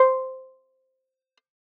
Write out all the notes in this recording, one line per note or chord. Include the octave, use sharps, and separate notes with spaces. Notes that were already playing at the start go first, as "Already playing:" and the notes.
Already playing: C5